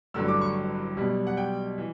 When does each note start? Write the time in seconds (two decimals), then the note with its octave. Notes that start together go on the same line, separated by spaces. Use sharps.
0.14 A1 G2 D3 F#3 E6
0.28 D6
0.41 C#6
0.96 B1 B2 G3
1.27 F#5
1.37 G5
1.78 E3